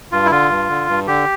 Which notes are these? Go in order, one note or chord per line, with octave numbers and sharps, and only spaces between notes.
G2 F4
E4
D3 F4
G2
D3
G2
D3 G4